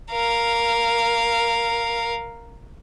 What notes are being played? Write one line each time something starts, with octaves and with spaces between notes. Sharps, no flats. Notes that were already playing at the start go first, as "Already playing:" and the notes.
A#4 F5